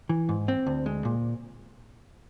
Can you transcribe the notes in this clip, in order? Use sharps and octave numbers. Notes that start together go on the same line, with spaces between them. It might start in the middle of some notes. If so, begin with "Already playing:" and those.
E3
G#2
C4
D2
G#3
A#2